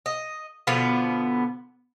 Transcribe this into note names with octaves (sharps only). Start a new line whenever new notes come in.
D#5
B2 D3 F3 B3